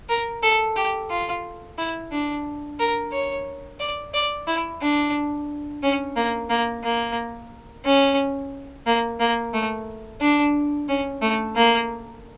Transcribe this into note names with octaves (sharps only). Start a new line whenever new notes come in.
A#4
A4
G4
F4
E4
D4
A#4
C#5
D5
D5
E4
D4
C#4
A#3
A#3
A#3
C#4
A#3
A#3
A3
D4
C#4
A3
A#3